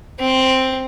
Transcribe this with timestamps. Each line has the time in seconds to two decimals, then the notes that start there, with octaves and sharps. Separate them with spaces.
0.20 C4